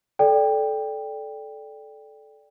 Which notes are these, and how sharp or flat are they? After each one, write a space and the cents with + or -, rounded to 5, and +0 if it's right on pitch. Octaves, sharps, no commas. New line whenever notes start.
A4 -15 D5 +0 G5 +10